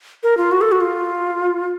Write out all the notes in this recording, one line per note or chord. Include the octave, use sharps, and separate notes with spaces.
A#4
F4
F#4
A4
F#4
F4